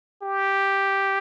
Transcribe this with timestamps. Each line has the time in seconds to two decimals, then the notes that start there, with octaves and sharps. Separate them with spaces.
0.22 G4